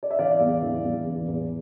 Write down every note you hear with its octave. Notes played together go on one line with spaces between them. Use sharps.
D5
E5
E3 D5 F5
E2
E3
E2
E3
E2